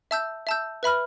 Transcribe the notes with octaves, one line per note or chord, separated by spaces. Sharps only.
E5 A5 E6 G6
E5 A5 E6 G6
B4 E5 B5 F6